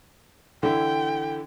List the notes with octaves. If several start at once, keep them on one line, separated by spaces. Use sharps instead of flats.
D3 E3 E4 G5